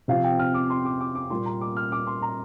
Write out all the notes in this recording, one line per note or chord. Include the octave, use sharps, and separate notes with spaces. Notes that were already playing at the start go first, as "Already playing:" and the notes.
C3 F3 C4 F5
G5
F6
D6
C6
D6
D6
D6
A#2 G3 A#3 C6
A#5
D6
F6
D6
C6
A#5